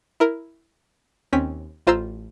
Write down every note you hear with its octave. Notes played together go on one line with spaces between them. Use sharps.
E4 A#4
D#2 C4 C#4 B6
A1 F4 C5 A#5 C6 E6